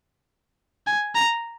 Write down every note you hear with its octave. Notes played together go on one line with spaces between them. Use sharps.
G#5
A#5